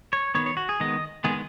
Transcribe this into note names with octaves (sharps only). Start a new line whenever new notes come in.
C#5
D#3 B3 C#5
C#5
F#4
G#4
D#3 G#3 B3 D#5
D#3 G#3 B3 G#4